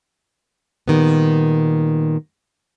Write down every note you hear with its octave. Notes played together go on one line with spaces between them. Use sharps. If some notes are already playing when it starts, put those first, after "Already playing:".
A#2 D#3 G3 B3